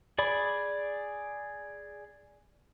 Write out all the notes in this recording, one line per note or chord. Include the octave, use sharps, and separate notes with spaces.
G#4 D5 B5